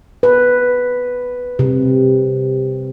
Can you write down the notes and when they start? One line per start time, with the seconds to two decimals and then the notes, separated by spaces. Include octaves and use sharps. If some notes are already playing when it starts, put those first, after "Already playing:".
0.23 B4
1.59 C3